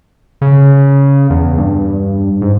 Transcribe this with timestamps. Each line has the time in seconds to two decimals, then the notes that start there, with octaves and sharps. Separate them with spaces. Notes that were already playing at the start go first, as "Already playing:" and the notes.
0.41 C#3
1.30 E2
1.58 G2
2.41 G#2